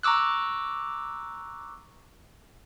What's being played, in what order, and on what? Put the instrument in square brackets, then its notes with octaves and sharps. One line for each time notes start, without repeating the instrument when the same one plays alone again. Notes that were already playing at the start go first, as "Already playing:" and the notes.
[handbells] A#5 C#6 D6 E6 F#6